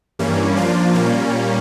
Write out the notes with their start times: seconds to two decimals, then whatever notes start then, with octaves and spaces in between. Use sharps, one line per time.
0.19 G2 E3 G3 A#3 C#4
0.57 F3 A#3 D4 F4
0.94 A#2 G3 A#3 C#4